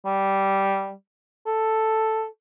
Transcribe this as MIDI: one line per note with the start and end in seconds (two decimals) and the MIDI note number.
0.06 0.93 55
1.47 2.26 69